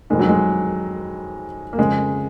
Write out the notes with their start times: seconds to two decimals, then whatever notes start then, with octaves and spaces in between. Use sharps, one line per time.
0.10 F2 D#3 G#3
0.19 F#3
0.29 G#3
1.73 A#3
1.78 F2 C#3 G#3